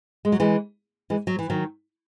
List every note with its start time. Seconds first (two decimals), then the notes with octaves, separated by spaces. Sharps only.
0.25 G#3
0.32 F#3
0.40 E3 G#3
1.10 E3 G#3
1.27 F#3
1.39 E3
1.50 D#3 F#3